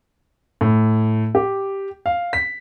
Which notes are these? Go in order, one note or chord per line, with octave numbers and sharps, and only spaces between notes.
A2
G4
F5
B6